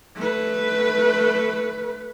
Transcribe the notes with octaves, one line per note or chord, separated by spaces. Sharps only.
A3 B4